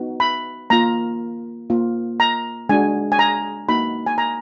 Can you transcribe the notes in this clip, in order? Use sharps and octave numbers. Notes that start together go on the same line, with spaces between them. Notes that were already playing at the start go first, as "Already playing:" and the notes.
Already playing: B3 D#4 F#4
B5
A#3 F4 A#5
A#3 F4
A#5
G#3 D4 F#4 G#5
G#5
A#5
A#3 D#4 F#4 B5
G#5
A#5